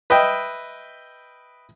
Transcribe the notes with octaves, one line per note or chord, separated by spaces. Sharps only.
B4 D#5 E5 G5